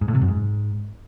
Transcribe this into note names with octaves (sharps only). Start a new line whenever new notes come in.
G#2
A2
C3
F#2
G#2